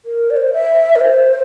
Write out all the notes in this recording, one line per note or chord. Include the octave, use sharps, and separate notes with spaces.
A#4
D5
C5
E5
A#4
C5